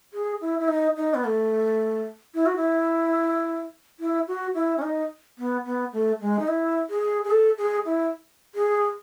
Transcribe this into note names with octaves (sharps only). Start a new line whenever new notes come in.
G#4
E4
E4
D#4
D#4
B3
A3
E4
F#4
E4
E4
F#4
E4
C#4
D#4
B3
B3
A3
G#3
D#4
E4
G#4
G#4
A4
G#4
E4
G#4